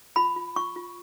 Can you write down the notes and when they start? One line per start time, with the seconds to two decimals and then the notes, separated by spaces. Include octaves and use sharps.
0.16 F4 B5
0.36 F4
0.56 F4 C#6
0.76 F4